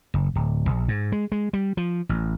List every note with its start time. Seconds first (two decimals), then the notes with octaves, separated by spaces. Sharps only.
0.14 F#1
0.35 D1
0.69 A#1
0.88 G#2
1.12 G#3
1.32 G#3
1.53 G3
1.77 F3
2.09 A1